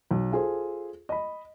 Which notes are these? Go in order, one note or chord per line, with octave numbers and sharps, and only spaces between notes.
B1
F4 G#4 A4 C5
D#5 B5